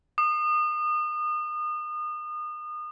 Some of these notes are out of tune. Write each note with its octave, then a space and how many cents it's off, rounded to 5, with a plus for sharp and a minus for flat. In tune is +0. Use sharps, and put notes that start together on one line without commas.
D#6 -30